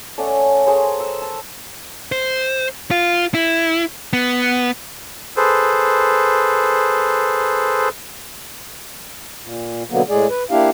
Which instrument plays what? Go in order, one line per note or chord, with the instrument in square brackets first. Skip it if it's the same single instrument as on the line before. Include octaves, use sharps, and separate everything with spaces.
[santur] A3 C#4 D5 F#5
G#4 A#4 C5 C#5
E6
A5
[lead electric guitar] C5
F4
E4
B3
[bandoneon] G#4 A4 B4 C5
[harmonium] A#2
B2 D3 F#3 A#3 B3
A2 G#3 G#4 D5
B4
A#3 D4 E4 G4 F5